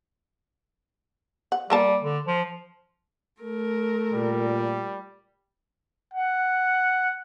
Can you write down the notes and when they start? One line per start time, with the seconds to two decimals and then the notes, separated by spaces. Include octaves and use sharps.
1.52 F#5
1.70 G3 A#3 A#4 A5
2.03 D3
2.27 F3
3.41 A3 A#4
4.14 A#2 G3
6.14 F#5